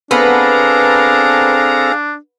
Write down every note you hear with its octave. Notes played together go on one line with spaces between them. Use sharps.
B3 C4 D4 G#4 A4 F5 A#5